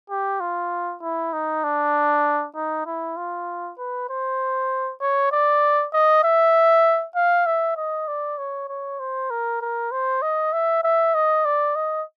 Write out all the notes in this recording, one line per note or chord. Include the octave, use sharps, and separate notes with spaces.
G4
F4
E4
D#4
D4
D#4
E4
F4
B4
C5
C#5
D5
D#5
E5
F5
E5
D#5
D5
C#5
C#5
C5
A#4
A#4
C5
D#5
E5
E5
D#5
D5
D#5